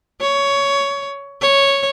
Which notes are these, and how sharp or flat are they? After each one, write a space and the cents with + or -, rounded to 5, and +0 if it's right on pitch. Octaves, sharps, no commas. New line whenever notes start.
C#5 +15
C#5 -5